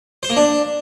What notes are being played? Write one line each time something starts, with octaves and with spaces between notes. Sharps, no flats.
C5
A#3
D4